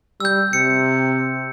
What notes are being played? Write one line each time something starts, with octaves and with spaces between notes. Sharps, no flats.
G3 E6 G6
C3 C#7